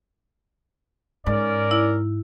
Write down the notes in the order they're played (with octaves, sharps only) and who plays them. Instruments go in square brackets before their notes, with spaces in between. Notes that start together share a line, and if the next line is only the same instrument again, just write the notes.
[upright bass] G#2 [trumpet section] C#4 A#4 D5
[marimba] E4